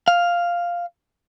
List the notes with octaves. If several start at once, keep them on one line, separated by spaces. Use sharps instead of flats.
F5